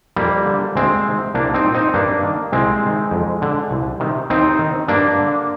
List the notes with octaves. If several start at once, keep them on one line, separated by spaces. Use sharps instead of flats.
F2 G3 A#3
D3
D2 G#3 C4
C3 D#3
C2 A#3 D4
C4 D#4
A#2
C4 D#4
G2 A#3 D4
D#3
C2 G#3 C4
C3 D#3
F2
D3
C2
C3 D#3
D#2 C4 D#4
D#3
G2 A#3 D4
D3